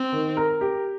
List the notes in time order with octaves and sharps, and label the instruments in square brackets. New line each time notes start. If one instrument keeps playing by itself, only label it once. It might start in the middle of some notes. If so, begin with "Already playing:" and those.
Already playing: [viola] C4
[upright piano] D#3
A#4
G4